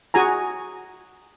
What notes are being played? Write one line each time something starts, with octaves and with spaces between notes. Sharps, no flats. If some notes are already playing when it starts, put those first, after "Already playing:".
F#4 G#4 G#5 A#5